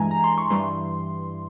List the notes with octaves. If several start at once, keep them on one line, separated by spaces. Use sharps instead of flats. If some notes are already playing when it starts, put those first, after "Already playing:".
Already playing: G2 E3 G#3 G#5 A#5
A#5
C6
C#6
G2 E3 G3 C6